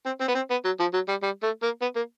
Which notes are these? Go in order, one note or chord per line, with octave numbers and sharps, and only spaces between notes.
C4
C4
B3
C4
B3
F#3
F3
F#3
G3
G3
A3
A#3
B3
A#3